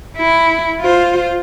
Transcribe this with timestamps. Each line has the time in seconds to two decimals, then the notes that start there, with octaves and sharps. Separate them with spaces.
0.17 E4
0.80 F4 C5